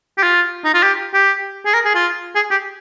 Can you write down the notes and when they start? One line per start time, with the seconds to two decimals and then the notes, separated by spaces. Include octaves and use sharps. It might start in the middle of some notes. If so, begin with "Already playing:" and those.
0.18 G4
0.23 F4
0.65 D#4
0.74 F4
0.83 G4
1.14 G4
1.66 G#4
1.74 A#4
1.85 G#4
1.95 F4
2.35 G#4
2.51 G4